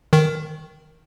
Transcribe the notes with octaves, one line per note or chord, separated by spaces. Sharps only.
D#3